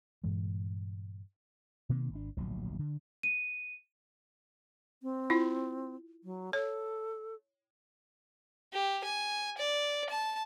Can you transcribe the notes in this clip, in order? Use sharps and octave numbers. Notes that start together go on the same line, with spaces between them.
G2 A#2 E3 G#3
B2 D#3 A#3 C4
G#1 D4
D1 A#1 B2 F#3
D3
D#7
C4
E4 F4
F#3
A4 C#5
G4
G#5
D5
A5